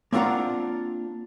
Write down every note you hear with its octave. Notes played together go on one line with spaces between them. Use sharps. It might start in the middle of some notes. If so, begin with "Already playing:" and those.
A#3 C4 D4 F4 F#5 A#5